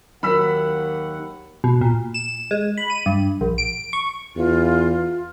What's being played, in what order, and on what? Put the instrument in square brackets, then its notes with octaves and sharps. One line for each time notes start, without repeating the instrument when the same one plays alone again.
[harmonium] D#2 D#3 F#5 [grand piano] F#3 A#3 [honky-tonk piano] B5 E6 B6
[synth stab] B2
A#2
E7
G#3
B5
D#7
G2
A#1
D7
C#6
[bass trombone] E2 [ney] F4